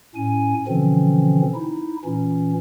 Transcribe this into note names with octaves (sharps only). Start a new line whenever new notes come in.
A2 C#4 G#5
B2 D3 E3 F3 C4 C#4
D#4 E4
A#2 E3 C#4